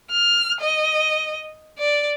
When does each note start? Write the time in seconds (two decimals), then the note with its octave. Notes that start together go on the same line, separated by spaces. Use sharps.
0.11 F6
0.60 D#5
1.78 D5